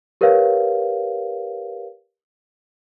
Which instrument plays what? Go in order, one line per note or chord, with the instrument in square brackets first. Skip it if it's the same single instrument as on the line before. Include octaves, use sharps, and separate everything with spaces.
[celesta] G4 A#4 B4 C#5 F5